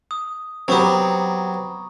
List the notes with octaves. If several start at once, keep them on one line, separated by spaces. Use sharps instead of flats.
D#6
F#3 B3 C4 G4 A#5 C#6 D#6